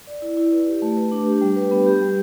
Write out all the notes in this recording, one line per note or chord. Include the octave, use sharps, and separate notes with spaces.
D5
E4
E4
B4
G4
A3
B4
D4
G4
G3
B4
B3
G4
G3